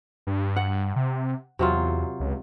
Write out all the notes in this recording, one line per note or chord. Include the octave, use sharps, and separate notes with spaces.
G2
F#5
C3
E2 C3 F#3 F4
C#2